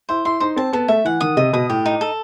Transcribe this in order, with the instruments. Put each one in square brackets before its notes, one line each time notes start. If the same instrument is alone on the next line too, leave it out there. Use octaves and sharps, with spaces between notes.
[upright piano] E4 [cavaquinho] C5
[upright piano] E4 [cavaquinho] C6
[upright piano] D#4 [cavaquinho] C5
[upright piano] C4 [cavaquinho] A5
[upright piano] B3 [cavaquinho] A4
[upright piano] A3 [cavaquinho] E5
[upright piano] E3 [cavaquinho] F#5
[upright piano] D#3 [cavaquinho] D#6
[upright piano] C3 [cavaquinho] D#5
[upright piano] B2 [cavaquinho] D#6
[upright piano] A2 [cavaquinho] G4
[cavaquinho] D#4
A4